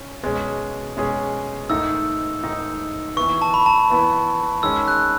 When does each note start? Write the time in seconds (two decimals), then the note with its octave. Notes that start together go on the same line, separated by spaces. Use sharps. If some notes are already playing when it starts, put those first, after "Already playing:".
Already playing: C#4
0.23 B2 G#3 C#4 G#4
0.97 B2 G#3 C#4 G#4
1.69 G#2 D#3 A3 D#4 E6
2.44 G#2 D#3 A3 D#4
3.17 E3 B3 E4 B4 C#6
3.42 A5
3.54 B5
3.66 A5
3.90 E3 B3 E4 B4
4.63 D#3 G#3 C#4 E6
4.88 F#6